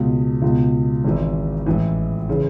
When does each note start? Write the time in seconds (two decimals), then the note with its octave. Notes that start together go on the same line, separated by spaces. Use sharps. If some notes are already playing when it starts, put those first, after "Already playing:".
Already playing: C#2 B2
0.42 C#2 B2
1.04 G#1 G#2 E3
1.66 A1 G#2 E3
2.29 C#3 E3